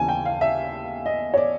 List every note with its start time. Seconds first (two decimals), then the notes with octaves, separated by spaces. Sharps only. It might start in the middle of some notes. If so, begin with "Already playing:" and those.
Already playing: D#2 C#3 E3 G#5 A5
0.08 G5
0.25 F5
0.41 E5
1.06 D#5
1.34 C#5
1.37 D5